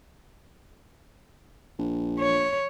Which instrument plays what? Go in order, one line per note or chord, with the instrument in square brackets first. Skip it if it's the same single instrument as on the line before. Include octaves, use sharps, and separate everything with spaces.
[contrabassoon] A#1
[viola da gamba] C#5